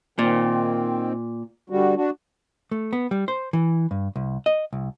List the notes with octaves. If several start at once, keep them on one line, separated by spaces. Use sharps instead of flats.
A#2 D#3 C4
D3 G3 F#4
D4 F#4
A3
B3
G3
C5
E3
G2
C2
D#5
C2